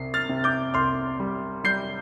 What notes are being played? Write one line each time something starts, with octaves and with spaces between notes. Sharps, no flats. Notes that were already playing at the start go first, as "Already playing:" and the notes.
Already playing: C2 C3 C7
F6 A6
C3
D6 G6
C2 C6 F6
G3
G3 G6 C7